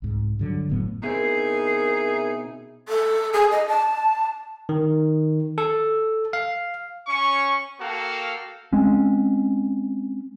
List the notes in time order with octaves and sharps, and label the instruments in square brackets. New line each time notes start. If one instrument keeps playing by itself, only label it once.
[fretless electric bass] C2 G#2
G2 D3 F#3
F#1 A2 F#3 B3
[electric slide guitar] B2 C4 [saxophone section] D#4 E4 G#4 [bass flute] A#4 [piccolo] C7
[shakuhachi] A4
G#4
D#5
A5
[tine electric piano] D#3
A4
F5
[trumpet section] C#4 C#6
A#3 F#4 A4 F5 G5
[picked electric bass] G#3 C4 C#4